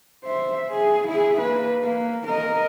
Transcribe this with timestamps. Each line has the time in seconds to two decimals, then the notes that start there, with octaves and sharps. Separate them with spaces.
0.25 C5 E5
0.70 G#4
1.08 E4 G#4
1.40 A#3 B4
1.83 A#3
2.27 A#4 D#5